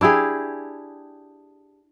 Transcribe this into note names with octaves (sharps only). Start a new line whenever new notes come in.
D4 E4 G4 G#4